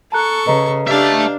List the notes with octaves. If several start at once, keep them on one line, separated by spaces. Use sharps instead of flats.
A4 A5 A#5 C#6 F#6
C#3 B4 D#5 A#5
D4 G4 E5 F5 A5